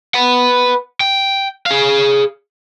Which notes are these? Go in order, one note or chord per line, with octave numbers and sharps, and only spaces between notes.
B4 F#5
G5
G#4 F5